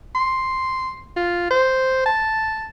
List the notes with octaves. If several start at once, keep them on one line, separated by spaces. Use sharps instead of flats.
C6
F4
C5
A5